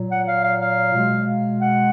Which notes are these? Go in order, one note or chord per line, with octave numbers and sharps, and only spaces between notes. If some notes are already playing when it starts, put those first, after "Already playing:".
Already playing: A#2 F#3
F#5
F5
F5
F5
B2 G#3
F#5